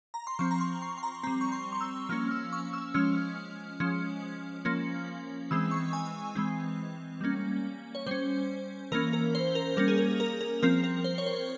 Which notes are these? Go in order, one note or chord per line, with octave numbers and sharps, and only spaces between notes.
A#5
C6
F3 C4 C#6
A#5
C6
C6
C6
A#5
G3 C4 A#5
C#6
C6
C#6
E6
F3 A#3 C#4 F6
E6
C#6
E6
F3 G#3 C#4 F6
F3 G#3 C#4
F3 A#3 C#4
E3 G#3 C4 E6
C#6
G#5
E3 G#3 C4
G3 A#3 C#4
C#5
G3 C#4 C5
E3 A#3 C#4 A#4
A#4
C5
A#4
G3 A#3 C#4 A#4
G#4
A#4
A#4
A#4
F3 C4 A#4
A#4
C5
C#5
C5